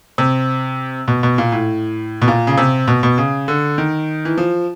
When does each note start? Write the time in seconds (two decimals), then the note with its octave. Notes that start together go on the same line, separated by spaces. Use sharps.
0.18 C3
1.08 B2
1.23 B2
1.38 A#2
1.52 A2
2.22 B2
2.28 A#2
2.47 C#3
2.58 C3
2.88 B2
3.03 B2
3.18 C#3
3.48 D3
3.78 D#3
4.25 E3
4.38 F3